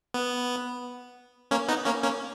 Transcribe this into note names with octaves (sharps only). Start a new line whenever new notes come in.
B3
A#3 C#4
B3 D#4
A#3 C#4
A#3 C#4